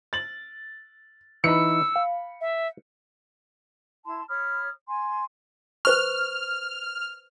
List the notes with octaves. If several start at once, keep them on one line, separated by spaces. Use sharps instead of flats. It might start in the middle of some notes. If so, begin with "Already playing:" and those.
A6 F#7
E3 D#4 B5 E6 C#7
F5
E5
E4 A5 C6
C#5 B5 D#6 F6
G#5 C6
B4 C5 C#6 F6